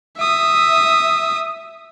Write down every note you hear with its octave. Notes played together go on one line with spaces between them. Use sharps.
E5 D#6